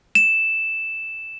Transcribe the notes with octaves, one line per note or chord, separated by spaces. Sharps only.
E7